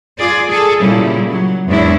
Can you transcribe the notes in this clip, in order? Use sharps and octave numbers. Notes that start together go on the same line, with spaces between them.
F4 G#4 D5
G#4 A4
A#2 C#3 G3 E4
F#3
E2 G#2 C#4 D4 E4